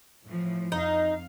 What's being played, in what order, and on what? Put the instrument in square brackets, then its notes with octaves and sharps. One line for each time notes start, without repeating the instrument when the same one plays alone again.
[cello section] A2 E3 F3
[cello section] F2 F5 [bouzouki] D#4